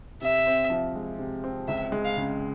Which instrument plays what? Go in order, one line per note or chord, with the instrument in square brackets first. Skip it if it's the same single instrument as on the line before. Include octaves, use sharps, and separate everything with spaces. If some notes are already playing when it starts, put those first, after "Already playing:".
[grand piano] C3 [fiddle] E5
[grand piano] C4
F3
G#3
C3
C4
[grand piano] C#2 [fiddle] E5
[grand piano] G#3
[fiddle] F5
[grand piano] C#3